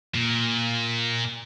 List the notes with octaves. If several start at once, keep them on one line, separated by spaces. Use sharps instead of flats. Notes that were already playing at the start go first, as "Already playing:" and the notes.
A#2